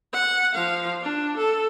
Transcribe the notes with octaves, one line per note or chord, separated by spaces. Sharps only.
F#5
F3 F5
D4
A4